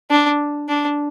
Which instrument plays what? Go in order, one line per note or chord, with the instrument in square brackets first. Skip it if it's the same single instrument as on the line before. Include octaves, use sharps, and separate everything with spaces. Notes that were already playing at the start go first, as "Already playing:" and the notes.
[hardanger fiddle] D4
D4